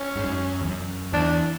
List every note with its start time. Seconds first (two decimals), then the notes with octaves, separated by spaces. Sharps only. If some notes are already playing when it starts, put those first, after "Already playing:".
Already playing: C#4
0.16 G#2
0.24 F#2
0.62 E2
0.69 F#2
1.13 E2 D4